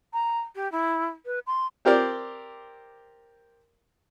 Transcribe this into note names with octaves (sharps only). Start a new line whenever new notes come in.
A#5
G4
E4
B4
C6
C4 G4 A#4 C5 D5